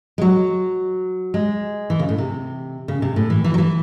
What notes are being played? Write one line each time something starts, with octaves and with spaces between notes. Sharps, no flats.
G#3
F#3
G#3
E3
C#3
A2
C3
C#3
C3
A2
E3
E3
F#3
E3